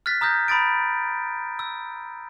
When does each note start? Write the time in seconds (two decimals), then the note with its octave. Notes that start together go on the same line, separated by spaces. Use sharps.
0.06 F6 F#6 A6 B6
0.21 A#5 D#6 F6 G6 A#6
0.48 A#5 B5 D#6 A6 D7
1.59 E6